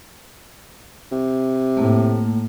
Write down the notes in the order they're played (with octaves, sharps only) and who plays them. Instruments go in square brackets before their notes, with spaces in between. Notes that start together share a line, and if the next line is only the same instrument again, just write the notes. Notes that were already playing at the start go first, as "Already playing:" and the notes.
[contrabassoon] C3
[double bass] A2 [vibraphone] A3 A#3